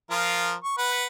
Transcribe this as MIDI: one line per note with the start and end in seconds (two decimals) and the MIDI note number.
0.10 0.54 53
0.10 0.54 65
0.10 0.54 70
0.64 0.77 85
0.78 1.06 71
0.78 1.06 78